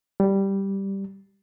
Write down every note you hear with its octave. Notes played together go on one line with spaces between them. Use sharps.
G3